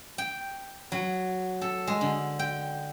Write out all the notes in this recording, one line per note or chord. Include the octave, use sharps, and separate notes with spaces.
G5
F#3
A4
G#3
D3
G5